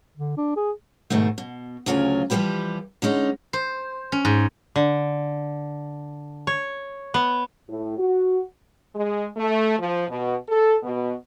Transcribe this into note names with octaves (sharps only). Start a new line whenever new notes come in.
D3
D4
G#4
G#2 B2 D#3 A3
B2
D2 C#3 F#3 F4 C5 G#5
E3 F3 G3 A#3 G4 B4
D3 G#3 C#4 D#4
C5
C#4
G#2
D3
C#5
B3
A2
F#4
G#3
A3
F3
B2
A4
B2